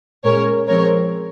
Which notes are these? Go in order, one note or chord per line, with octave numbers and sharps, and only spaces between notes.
A#2 G#3 C#4 A#4 C#5
F3 G#3 C4 A#4 C#5